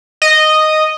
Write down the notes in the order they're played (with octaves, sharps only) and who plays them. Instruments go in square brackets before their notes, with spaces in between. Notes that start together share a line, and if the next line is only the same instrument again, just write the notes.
[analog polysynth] D#5